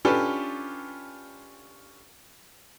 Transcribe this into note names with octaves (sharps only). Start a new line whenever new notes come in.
C#4 D4 F4 G4 A4 B4